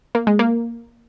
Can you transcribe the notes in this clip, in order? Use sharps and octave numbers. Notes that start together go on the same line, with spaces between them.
A#3
G#3
A#3